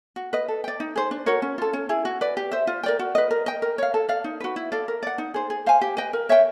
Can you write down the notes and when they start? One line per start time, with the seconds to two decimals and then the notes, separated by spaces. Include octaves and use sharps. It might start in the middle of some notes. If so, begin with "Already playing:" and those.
0.16 F#4
0.33 B4 D#5
0.48 A4
0.64 D5 G5
0.80 D#4
0.96 G#4 C5
1.11 D4
1.26 F#4 A#4 C#5
1.42 C#4
1.58 F4 A4
1.73 C#4
1.89 E4 G#4
2.05 F#4
2.21 B4 D5
2.37 G4
2.51 C5 E5
2.67 F4
2.83 A#4 D5 G5
2.99 F#4
3.15 B4 D#5
3.31 A#4
3.46 D#5 G5
3.62 A#4
3.78 C#5 F5
3.94 A4
4.09 D5 F5
4.24 D#4
4.40 F#4 B4
4.56 E4
4.72 A4 D5 F5
4.88 A#4
5.03 D5 F#5
5.18 D#4
5.34 G#4 C5
5.50 G#4
5.66 C5 F5 G#5
5.81 G4
5.97 B4 D#5 G5
6.13 A#4
6.29 C#5 E5 G5